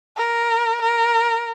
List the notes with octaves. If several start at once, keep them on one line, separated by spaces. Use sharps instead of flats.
A#4
A#4